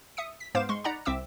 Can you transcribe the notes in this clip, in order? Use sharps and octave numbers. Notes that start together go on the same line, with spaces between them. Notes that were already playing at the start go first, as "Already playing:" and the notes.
E5 D#6 C#7
B6
G#2 B3 C5 F5 D6 E7
G#3 C6 C#6
D#4 D5 F#5 A#5 B5
C2 C4 E5 D6 E6